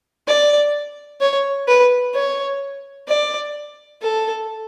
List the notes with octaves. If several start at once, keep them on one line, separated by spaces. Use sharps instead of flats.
D5
C#5
B4
C#5
D5
A4